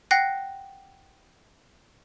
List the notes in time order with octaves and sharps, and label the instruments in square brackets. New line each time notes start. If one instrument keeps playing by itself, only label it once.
[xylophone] F#5 G5 F#6 A#6 C7